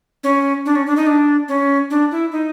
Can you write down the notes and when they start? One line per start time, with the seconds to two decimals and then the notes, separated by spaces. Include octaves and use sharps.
0.23 C#4
0.66 D4
0.75 C#4
0.86 D4
0.96 D#4
1.07 D4
1.48 C#4
1.90 D4
2.11 E4
2.32 D#4